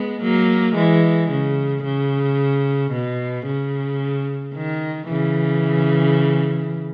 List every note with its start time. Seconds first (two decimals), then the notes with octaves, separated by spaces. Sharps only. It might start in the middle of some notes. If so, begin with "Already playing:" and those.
Already playing: G#3 B3
0.22 F#3 A#3
0.75 E3 G#3
1.30 C#3
1.84 C#3
2.92 B2
3.46 C#3
4.54 D#3
5.09 C#3 E3